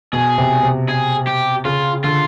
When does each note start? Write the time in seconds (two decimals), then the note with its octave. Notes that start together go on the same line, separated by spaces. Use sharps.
0.13 B2 G#4
0.38 C3
0.63 C3
0.89 G#4
1.27 G4
1.65 C#3 F4
2.04 D3 F4